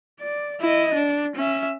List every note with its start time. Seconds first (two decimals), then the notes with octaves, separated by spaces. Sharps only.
0.20 D5
0.61 E4 D#5
0.94 D4
1.36 C#4 E5